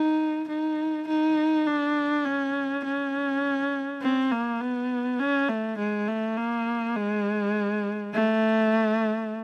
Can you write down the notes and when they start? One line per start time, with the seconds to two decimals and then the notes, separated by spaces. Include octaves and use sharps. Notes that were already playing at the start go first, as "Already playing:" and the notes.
Already playing: D#4
0.49 D#4
1.08 D#4
1.66 D4
2.25 C#4
2.85 C#4
4.02 C4
4.32 A#3
4.61 B3
5.19 C#4
5.49 A3
5.78 G#3
6.08 A3
6.37 A#3
6.96 G#3
8.14 A3